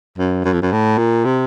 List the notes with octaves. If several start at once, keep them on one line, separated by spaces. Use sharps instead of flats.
F#2
F#2
F2
F#2
A2
A#2
C3